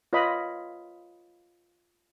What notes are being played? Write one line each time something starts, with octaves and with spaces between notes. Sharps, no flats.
F4 B4 C#5 D#5 B5